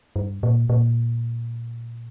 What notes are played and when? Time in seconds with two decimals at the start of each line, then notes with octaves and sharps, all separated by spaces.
0.16 G2
0.43 A#2
0.69 A#2